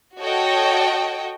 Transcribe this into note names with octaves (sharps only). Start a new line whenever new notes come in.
F#4 A4 C#5 D#5 G5